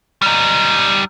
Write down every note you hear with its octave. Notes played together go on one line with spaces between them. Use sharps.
G3 D#4